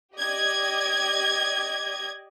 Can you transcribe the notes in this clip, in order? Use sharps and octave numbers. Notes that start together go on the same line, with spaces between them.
G4 D5 D#5 G#6